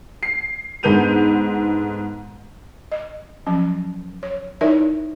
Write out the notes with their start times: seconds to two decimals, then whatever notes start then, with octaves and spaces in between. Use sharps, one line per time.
0.23 C7
0.83 G#2 D3 B3 G6 D#7 F7
2.92 D#5
3.47 F3 F#3 C#4
4.23 C#5
4.61 D#4 E4 A#4 C#5 D5 E5